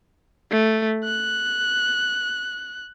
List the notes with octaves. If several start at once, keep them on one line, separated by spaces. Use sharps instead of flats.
A3
F#6